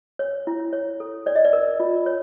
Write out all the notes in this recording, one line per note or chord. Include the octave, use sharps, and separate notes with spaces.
C#5
E4
C#5
A4
C#5 D5
D#5
D5
A#4
F4
C#5